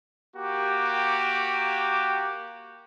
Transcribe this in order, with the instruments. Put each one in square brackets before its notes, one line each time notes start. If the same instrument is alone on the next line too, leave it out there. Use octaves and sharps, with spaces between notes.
[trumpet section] A#3 F#4 G4